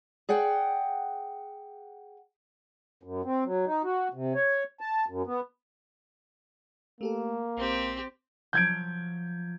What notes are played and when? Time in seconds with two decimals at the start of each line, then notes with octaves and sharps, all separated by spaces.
0.29 G#4 D5 F#5 G5
3.03 F#2
3.25 C4
3.45 F#3
3.66 D#4
3.84 F#4
4.14 C3
4.35 C#5
4.81 A5
5.09 F#2
5.26 B3
7.01 A3 A#3 G4 A4
7.57 A#1 C4 G4 C5
8.53 F3 F#3 F4 G6 G#6 D7